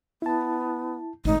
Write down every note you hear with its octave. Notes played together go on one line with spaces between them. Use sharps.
B3 E4 A5
G#1 A2 D#4